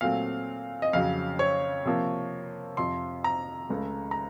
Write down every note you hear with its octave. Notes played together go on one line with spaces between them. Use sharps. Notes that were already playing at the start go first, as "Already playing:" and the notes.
A#2 F#3 A3 C4 F5
D#5
F2 C#3 F#3 F5
C#5
C3 F3 A#3
F2 C3 F3 C6
A#5
C#2 C#3 A3
A#5